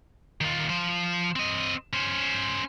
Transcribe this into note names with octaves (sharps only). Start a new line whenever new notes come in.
D#3 F4
F3 C5
C4 D#5
C#4 C5